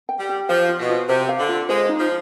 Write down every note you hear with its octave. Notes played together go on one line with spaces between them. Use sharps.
G5
G3
G4
F3 F5
F4
B2
F4
C3 C5
F5
D3
F4
G#3 C5
D#4
F3